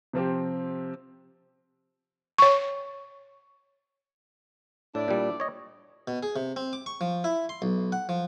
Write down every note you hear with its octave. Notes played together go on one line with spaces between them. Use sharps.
C3 F3 C4 G4
C#5 C#6
A2 D4 E4 D5
A#2 G3
C#5 D#5
B2
G#4
C3
C4
D6
C#6
F3
E4
C6
B1
F#5
F3